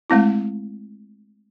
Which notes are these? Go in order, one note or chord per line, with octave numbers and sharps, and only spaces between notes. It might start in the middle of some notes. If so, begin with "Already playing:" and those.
G#3 A3 C4 E4